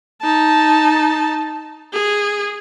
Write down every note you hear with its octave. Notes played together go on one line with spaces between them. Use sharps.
D#4 A5
G#4